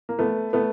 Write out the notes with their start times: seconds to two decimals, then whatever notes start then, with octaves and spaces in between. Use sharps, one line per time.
0.09 A#3
0.19 A3 B3
0.53 A3 B3